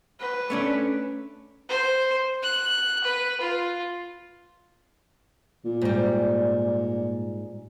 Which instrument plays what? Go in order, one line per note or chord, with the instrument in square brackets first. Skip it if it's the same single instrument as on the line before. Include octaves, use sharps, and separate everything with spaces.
[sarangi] B4
[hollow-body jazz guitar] A3 C#4 D4
[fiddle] C5
F#6
B4
F4
[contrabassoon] A#2
[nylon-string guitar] G#2 G3